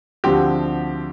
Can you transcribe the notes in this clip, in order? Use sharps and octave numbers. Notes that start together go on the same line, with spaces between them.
D2 D3 F3 C4 G4